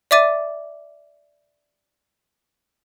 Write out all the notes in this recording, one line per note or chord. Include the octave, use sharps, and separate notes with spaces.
D5 E5 D6 A6 D#7